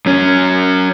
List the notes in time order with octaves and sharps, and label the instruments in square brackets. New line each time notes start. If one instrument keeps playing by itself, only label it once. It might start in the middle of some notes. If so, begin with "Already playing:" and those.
[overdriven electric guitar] F#2 C#4